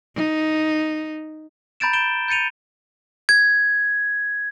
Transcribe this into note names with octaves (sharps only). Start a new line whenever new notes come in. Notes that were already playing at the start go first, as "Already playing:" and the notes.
D#4
A#5 B5 G6 A6 D7 E7
G6 D7 E7 G7
G6 A6 C#7 D#7 F7
G#6